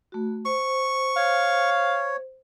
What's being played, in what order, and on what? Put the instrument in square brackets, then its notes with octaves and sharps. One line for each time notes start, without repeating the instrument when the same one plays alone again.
[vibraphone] A3 F#4
[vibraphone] C5 [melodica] C#6
[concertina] C#5 [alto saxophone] F5